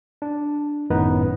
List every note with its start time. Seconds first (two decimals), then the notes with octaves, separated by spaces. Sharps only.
0.22 D4
0.90 G#1 F#2 A2 B3 D#4 B4